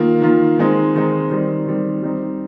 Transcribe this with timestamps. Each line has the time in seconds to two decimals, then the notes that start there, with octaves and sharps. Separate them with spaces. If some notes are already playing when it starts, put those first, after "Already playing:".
Already playing: D#3 A#3 F4
0.22 D#3 A#3 F4
0.58 D#3 G#3 C4 D#4
0.95 D#3 G#3 C4 D#4
1.30 D#3 G3 C4
1.66 D#3 G3 C4
2.02 G3 C4 D#4